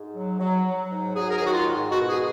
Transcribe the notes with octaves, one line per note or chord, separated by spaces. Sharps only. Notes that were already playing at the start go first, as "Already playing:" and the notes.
Already playing: G#2
F#3
F#3
F#3
G#2
F#3 G#4
A#4
G#4
D#3 F#4
F4
G#2
B2 F#4
G#4